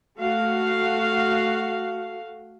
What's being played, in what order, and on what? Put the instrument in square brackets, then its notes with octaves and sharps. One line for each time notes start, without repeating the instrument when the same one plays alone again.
[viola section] A3 F#4 F5